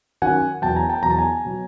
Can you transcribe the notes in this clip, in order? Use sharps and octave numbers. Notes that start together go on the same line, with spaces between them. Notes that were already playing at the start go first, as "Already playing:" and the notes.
F#2 D#3 F#3 F#5 G#5
E2 B2 F#3 G5 A5
G#5 A#5
G5 A5
E2 B2 F#3 A#5
A5
G#5 A#5
B2 F#3